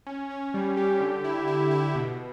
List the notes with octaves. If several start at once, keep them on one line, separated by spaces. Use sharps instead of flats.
C#4
C#4
G3
G4
D3
E4
E4
E4
B2